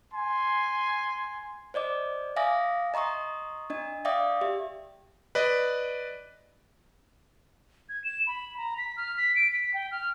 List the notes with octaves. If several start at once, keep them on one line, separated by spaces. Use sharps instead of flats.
G#5 C6
C5 D5 D#5 D6
E5 F5 G#5 D6 D#6 A#6
D#5 A#5 C6 C#6 D#6
D4 D#5
D5 E5 F5 G5 D6 D#6
G4 E5
B4 D5 D#5
G#6
E7
B5
A#5
B6
F6
B6
D7
B6
G5
F6